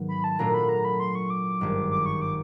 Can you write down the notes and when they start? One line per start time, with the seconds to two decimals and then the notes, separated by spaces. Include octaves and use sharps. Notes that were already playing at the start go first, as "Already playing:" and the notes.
Already playing: G#2 D#3 F#3 B3
0.08 B5
0.24 A5
0.39 A#2 F#3 A3 D4 F4 A#5
0.54 B5
0.69 A#5
0.85 B5
1.00 C6
1.15 C#6
1.30 D6
1.61 G#1 G2 D#3
1.91 D6
2.06 C#6
2.21 D6